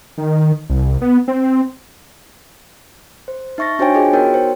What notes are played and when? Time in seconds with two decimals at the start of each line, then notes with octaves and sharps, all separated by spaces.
0.18 D#3
0.70 C2
1.02 B3
1.28 C4
3.28 C5
3.58 D#4 E5 C#6 A6 A#6
3.79 D4 F#4 C5 C#5 G5 G#5
3.95 F4 G#4 D#5 G5
4.13 B3 D#4 F#4 A#4 C#5 G5
4.34 C5